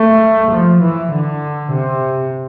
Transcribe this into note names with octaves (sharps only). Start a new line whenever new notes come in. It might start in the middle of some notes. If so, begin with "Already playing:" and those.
Already playing: A3
F3
E3
D3
C3